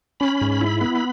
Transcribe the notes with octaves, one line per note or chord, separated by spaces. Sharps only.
C#4 B5
G#2
E4
B3